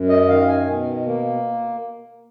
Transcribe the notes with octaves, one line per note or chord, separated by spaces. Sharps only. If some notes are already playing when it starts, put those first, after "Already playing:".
Already playing: F#2
D#5
D#3 F5
G#5
B2
A#3